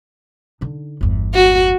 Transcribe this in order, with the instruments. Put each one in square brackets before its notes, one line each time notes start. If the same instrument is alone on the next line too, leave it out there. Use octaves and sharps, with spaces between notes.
[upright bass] D3 D#4
G1 E2
[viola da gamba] F#4